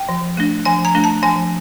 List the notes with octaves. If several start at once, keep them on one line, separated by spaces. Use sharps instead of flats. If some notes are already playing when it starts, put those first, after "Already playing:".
Already playing: G5
F3
A3 D4
F3 G#5
A#5
A3 D4
A5
F3 G#5